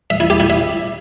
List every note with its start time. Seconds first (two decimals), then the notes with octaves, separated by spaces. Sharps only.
0.10 E5
0.20 E4
0.30 G4
0.40 E4
0.50 E5